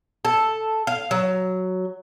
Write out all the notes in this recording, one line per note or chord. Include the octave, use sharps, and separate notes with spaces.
A4
F5
F#3